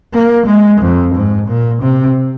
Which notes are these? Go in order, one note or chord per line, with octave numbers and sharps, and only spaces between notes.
A#3
G#3
F2
G#2
A#2
C3